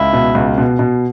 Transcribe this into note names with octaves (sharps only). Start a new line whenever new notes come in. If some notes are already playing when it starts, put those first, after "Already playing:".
Already playing: C#2 E4
B2
C#2
B2
B2